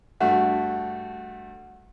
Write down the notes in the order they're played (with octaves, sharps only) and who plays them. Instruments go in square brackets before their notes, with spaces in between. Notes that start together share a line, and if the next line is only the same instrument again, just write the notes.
[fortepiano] G2 A3 F#4 [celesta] F#5